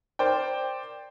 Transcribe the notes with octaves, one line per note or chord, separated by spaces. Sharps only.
A#4 C5 D5 G5